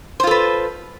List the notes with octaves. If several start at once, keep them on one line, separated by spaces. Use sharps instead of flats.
F4 A4 B4 C5